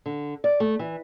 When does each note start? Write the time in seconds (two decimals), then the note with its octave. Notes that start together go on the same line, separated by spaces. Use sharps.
0.06 D3
0.44 D5
0.60 A3
0.79 E3